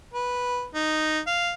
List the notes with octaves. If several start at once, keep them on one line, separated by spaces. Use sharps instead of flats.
B4
D#4
F5